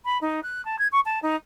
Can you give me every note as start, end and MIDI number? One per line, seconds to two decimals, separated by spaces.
0.05 0.18 83
0.21 0.40 63
0.43 0.64 90
0.65 0.79 81
0.79 0.87 92
0.92 1.00 85
1.05 1.19 81
1.22 1.36 63